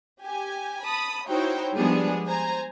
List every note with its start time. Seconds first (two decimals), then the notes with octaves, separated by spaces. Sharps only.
0.22 G4 G#5
0.85 A5 B5 D#6
1.27 D#4 E4 F#4 C5 C#5 G5
1.76 F3 G3 G#3 B3 D4 G#4
2.26 C5 G#5 A#5